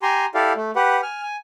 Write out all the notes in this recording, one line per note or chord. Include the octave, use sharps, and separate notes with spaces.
G4 G#5 A#5 C6
E4 G4 A4 D5 F5
A3
G4 B4 F#5
G#5 F6
G#5